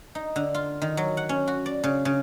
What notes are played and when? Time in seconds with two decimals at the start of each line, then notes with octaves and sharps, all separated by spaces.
0.15 D#4
0.36 D3
0.54 F4
0.82 D#3
0.97 F#3
1.17 F#5
1.29 C#4
1.47 F#4
1.66 D5
1.84 C#3
2.05 C#3